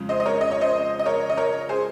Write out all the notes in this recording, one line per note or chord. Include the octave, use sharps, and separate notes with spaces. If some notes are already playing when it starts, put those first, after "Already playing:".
Already playing: F2 C#3 G#3
C5 D#5
D#5
A#4 C#5
D#5
C#5
C5 D#5
D#5
A#4 C#5
D#5
A#4 C#5
G#4 C5